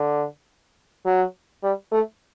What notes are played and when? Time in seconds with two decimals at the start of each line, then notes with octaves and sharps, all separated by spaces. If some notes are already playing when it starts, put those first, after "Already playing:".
Already playing: D3
1.06 F#3
1.63 G3
1.92 A3